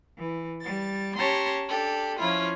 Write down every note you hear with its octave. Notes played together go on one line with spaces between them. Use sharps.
E3
G3 A6
C#4 G4 C#5 A5 A#5 C6
D4 G4 A4
F3 C#4 E4 F4